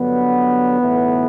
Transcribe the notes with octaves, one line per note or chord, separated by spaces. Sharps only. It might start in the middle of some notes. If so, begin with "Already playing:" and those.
Already playing: G2 D3 F#3 B3
B1 A2 E3